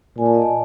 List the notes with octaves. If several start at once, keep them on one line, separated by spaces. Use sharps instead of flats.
A#2 G#5
A5
D#5
D5